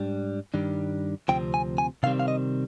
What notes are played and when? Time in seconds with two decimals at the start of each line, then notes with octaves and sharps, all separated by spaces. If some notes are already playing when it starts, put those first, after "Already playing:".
Already playing: G#2 G3 D4
0.54 G2 D#3 G3 D4
1.28 D2 C3 F3 C4 G5
1.54 G#5
1.78 G#5
2.03 C3 D#3 G3 C4 F5
2.20 F5
2.28 D#5